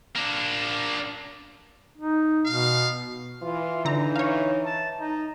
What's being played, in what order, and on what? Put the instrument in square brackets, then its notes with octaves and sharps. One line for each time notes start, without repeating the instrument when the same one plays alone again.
[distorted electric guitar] A#3 D4
[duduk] D#4
[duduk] B2 [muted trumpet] F5
[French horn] E3 [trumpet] F4
[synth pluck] D3 A#5 [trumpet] D#4
[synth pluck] C#5 F5
[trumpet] A5
D#4